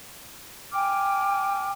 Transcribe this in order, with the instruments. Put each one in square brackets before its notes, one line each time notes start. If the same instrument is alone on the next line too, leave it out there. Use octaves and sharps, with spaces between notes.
[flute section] G5 G#5 D6 F6